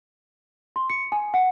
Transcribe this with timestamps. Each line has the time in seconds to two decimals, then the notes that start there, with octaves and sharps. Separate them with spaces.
0.76 C6
0.90 C#7
1.12 G#5
1.34 F#5